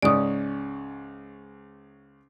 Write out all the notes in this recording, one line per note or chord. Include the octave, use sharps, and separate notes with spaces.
C#2 G#2 C#4 D5 D#6